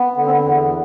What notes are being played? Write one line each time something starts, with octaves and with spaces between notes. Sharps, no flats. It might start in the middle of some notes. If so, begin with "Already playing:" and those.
Already playing: B3
D3
C4
B3
E2